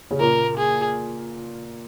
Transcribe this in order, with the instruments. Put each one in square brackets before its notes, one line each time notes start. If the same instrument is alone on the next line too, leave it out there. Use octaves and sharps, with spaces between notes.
[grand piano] C#3 C#4
[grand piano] A#2 A#3 [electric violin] A#4
[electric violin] G#4